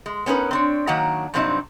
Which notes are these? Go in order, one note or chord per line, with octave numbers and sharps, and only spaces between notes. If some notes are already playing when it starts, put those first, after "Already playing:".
G#3
B3 C#4 D#4 A#4 B4
C4 D4 C#5
D#3 F#3 A#3 D4 F#5 A#5
G2 C3 F#3 C4 D4 D#4